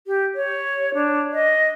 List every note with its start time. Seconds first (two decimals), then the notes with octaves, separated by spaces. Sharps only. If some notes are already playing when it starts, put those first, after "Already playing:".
0.07 G4
0.35 C#5
0.94 D4
1.33 D#5